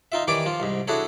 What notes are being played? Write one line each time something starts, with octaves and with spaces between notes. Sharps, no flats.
D#4 F4 E5
D#3 E3 G4 C#5 D5 D6
F3 F4
C2 G#2
D4 E4 F#4 G#4 A4 C#5